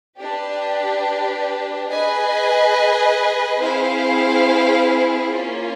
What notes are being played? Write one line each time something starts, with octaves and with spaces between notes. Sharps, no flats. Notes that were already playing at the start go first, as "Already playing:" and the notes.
D4 G4 B4
G#4 B4 D#5 G#5
C4 E4 G#4 C5 F5
A#3 C#4 F4